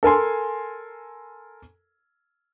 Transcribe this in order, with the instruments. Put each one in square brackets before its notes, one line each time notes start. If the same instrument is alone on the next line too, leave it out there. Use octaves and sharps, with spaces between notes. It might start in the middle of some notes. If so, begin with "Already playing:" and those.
[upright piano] A4 A#4 G#5 C6